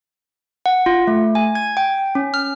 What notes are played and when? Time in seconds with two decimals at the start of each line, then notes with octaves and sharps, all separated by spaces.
0.66 F#5
0.86 F4
1.07 A3
1.35 G#5
1.55 G#6
1.77 G5
2.15 C#4
2.34 F6